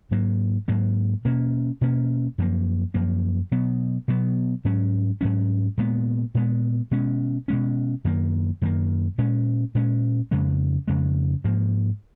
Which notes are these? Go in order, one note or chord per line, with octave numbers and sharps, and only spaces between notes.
G#2 F#3 A#3
G#2 F#3 A#3
B2 A#3 C#4
B2 A#3 C#4
F#2 F3 A#3
F#2 F3 A#3
B2 F#3 B3
B2 F#3 B3
G#2 F#3 C#4
G#2 F#3 C#4
A#2 G#3 B3
A#2 G#3 B3
B2 G#3 C#4
B2 G#3 C#4
F#2 D#3 A#3
F#2 D#3 A#3
A#2 G#3 C#4
A#2 G#3 C#4
F2 C#3 G#3
F2 C#3 G#3
G#2 F3 A#3